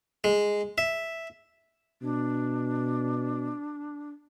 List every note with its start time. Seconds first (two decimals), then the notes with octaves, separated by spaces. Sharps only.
0.24 G#3
0.78 E5
2.02 B2 D4